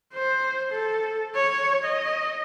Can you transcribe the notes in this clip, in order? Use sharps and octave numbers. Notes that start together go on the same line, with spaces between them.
C5
A4
C#5
D#5